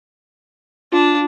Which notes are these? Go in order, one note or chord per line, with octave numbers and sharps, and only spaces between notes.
D4 F4